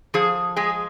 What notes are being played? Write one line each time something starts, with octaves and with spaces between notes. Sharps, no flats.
F3 G#4
G#3 G#4